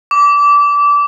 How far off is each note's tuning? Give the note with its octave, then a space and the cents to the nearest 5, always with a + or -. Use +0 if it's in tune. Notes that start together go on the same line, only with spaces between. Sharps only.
D6 -20